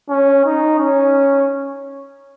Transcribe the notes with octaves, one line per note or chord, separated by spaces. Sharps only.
C#4
D#4
C#4